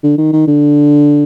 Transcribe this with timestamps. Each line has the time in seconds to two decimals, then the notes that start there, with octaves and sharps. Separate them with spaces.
0.03 D3
0.18 D#3
0.33 D#3
0.48 D3